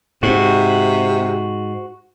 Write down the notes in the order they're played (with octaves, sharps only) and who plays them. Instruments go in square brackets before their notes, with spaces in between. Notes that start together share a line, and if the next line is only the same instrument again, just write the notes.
[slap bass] G#2 [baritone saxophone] C3 [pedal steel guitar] F#4